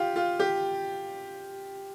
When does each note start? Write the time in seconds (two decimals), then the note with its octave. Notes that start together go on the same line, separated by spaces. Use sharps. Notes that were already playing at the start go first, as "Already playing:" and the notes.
Already playing: F4 G4
0.16 F4
0.40 G4